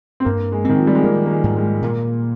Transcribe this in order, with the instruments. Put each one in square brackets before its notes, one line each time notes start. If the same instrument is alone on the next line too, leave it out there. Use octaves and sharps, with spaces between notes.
[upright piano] C4
[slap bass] G2 [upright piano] A#3
[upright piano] G#3
[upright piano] D#3 [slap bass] C4
[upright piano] F3
G3
G#3
[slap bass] D#3 [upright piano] A#3
[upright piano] A#3
G#3
[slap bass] G#2
[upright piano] G#3
[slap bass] A#2 [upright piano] A#3